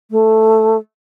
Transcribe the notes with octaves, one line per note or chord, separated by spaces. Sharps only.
A3